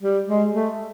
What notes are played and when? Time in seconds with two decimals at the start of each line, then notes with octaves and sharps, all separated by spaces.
0.01 G3
0.26 G#3
0.52 A3